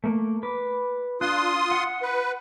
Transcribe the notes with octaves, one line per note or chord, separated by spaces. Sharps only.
A3 A#3
B4 D6
D4 F4 C6 D#6 F#6
F#5
B4